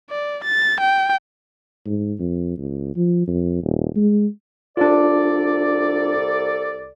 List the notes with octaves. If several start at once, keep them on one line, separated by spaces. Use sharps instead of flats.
D5
A6
G5
G#2
F2
C#2
F3
F2
D#1
G#3
C2 D4 F4 A4 D5